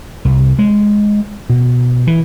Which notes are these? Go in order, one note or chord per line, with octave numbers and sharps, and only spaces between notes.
C2
G#3
B2
E3